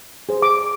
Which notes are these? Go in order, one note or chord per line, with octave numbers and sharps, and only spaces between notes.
G#4 C5
D6